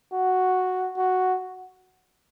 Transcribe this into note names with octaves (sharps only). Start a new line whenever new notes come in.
F#4
F#4